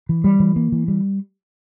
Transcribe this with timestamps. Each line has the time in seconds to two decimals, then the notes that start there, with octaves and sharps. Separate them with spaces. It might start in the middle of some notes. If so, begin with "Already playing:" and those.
0.09 E3
0.24 G3
0.40 E3
0.56 A#3
0.72 E3
0.88 G3